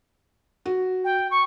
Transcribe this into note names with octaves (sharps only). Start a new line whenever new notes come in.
F#4
G5
C#6